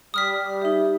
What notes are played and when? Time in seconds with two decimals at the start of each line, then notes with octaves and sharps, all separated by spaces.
0.14 G3 D#6 F6 B6
0.62 D#4 G4 E5